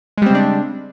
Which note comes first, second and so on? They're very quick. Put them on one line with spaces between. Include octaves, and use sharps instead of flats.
G#3 G3 C4 C#3 D4